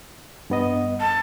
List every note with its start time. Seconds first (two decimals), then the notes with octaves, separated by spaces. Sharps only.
0.50 G2 B3 D#5
1.00 A5